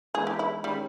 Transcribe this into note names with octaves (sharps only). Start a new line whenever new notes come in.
E3 G#3 B3 G#4
G4
E4
D#3 G3 G#3 C#4 G4